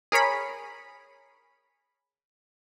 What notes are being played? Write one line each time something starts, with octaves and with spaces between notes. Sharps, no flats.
G#4 A#4 C#5 B5